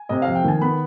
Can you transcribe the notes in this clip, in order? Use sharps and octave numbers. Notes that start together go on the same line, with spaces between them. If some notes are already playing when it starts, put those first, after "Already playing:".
Already playing: G#5
C3 D#5
F2 F5
G5
D#3 G#5
B3 B5